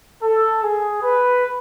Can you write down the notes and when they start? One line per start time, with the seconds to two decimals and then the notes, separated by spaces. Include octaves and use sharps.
0.23 A4
0.63 G#4
1.02 B4